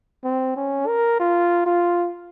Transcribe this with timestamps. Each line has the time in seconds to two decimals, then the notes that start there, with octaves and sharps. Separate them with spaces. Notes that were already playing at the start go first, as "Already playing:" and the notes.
0.24 C4
0.56 C#4
0.87 A#4
1.20 F4
1.66 F4